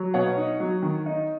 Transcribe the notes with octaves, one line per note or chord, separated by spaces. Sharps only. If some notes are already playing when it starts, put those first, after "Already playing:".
Already playing: F#3
B2 C#5 F#5
D#4
F#3
D#3
D#4